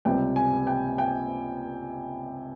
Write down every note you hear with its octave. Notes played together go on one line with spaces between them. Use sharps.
C#2 C3 G3 G5
G#5
G5
G5